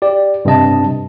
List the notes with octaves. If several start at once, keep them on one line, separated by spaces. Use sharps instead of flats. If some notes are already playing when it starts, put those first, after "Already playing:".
G4 D5
G2 C3 D#5 A5